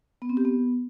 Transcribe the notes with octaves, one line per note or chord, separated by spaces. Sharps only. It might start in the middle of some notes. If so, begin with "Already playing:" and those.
B3
C4
G4
B3